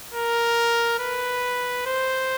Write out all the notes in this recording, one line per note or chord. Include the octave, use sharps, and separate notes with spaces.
A#4
B4
C5